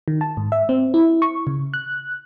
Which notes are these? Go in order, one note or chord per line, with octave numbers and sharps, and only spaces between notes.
D#3
A5
G#2
E5
C4
E4
C#6
C#3
F#6